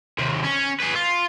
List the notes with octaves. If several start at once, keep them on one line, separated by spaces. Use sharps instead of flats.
D#2 C3
C#4
G#4 B4
F4